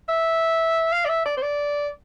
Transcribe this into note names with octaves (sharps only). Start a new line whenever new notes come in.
E5
F5
D5
E5
D5
C5
D5